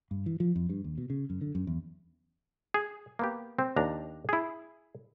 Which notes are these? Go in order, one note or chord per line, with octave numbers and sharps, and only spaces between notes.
G2
E3
F3
F2
G2
D#2
B2
C#3
F#2
D3
F#2
E2
G#4
A#3 B3 G4
C4
D#2 D4 A#5
E4 G#4